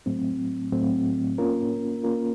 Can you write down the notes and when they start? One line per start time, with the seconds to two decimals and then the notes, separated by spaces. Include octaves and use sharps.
0.06 A2 F#3 A3 C4
0.72 A2 F#3 A3 C4
1.38 A#3 C#4 F4 A#4
2.03 A#3 C#4 F4 A#4